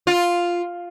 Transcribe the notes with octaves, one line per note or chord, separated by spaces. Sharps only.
F4